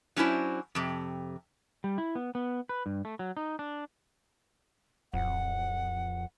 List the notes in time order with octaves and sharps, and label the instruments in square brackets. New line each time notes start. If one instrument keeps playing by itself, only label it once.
[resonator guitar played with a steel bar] F#3 C#4 D4 E4 C5
F2 C3
[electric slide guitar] G3
E4
B3
B3
B4
G2
A3
F#3
D#4
D4
[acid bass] D1 [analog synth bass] F2 [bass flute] F#5